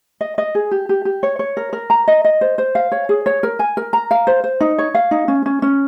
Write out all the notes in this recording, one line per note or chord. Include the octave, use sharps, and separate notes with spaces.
D#5
D#5
G#4
G4
G4
G4
C#5
C#5
A#4
A#4
A#5
D#5
D#5
C5
C5
F5
C#5
G#4
C#5
A#4
G#5
A#4
A#5
F5
C5
C5
D#4
C#5
F5
D#4
C#4
C#4
C#4